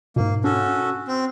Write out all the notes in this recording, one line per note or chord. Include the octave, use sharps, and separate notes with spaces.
G#2 B2 A#3
C#4 D4 F#4 A4
C4